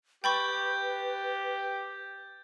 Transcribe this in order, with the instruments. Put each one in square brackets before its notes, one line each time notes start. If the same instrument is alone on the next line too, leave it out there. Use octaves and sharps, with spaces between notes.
[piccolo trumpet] G4 [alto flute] B4 [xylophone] G5 B5 C#6 [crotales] G6 A6